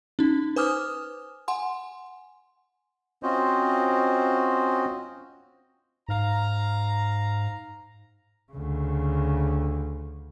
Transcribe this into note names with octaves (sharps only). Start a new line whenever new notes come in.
C#4 D#4
B4 C5 G#5 D6 D#6 F6
F#5 G#5 C6
C4 C#4 F4 F#4 C5 D#5
G#2 F5 A#5
D2 C#3